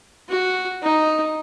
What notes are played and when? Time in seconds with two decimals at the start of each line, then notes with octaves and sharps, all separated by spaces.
0.29 F#4
0.82 D#4